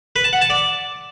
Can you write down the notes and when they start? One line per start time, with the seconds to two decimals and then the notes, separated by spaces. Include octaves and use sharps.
0.16 B4
0.24 A5
0.33 F#5
0.41 A5
0.50 D5